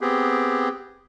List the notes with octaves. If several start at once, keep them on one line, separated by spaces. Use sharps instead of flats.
B3 C4 G4 G#4